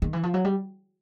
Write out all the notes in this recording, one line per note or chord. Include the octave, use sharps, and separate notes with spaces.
D#3
E3
F3
F#3
G3